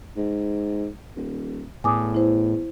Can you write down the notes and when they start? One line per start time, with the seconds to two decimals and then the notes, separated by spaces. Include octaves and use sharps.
0.17 G#2
1.16 D#1
1.84 E2 A2 G#5 D6 D#6
2.15 E4 C5